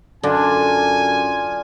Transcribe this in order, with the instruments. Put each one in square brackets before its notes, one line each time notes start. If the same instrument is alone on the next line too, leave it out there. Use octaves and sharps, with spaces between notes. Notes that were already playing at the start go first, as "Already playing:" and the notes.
[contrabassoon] F#2 [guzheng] D3 [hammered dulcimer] D4 F4 [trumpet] G#5